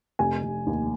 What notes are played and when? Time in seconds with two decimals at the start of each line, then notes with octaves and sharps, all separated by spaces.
0.19 F1 G#5
0.43 F1
0.67 D#2